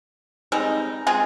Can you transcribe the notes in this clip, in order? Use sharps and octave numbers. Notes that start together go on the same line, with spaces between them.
G3 G#3 C4 D#4
G#3 C4 F4 G#4